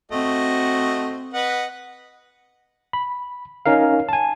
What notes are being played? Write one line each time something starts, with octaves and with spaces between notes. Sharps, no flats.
A3 C4 F#4 D#5
B4 D#5 F#5
B5
C#4 D#4 A#4 F5
G#5 A5